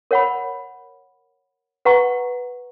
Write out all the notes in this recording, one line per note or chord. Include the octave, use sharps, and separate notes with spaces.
A#4 C#5 F#5 B5
B4 F#5 A#5 C#6